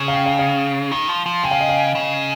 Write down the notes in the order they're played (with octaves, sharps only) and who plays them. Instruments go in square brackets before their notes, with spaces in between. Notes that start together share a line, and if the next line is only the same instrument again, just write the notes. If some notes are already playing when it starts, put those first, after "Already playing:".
Already playing: [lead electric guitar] C#3
[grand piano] F5
G5
F5
F5
[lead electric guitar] D#3
F3
F3
[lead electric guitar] C#3 [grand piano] G5
[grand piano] F5
D#5
F5
[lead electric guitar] C#3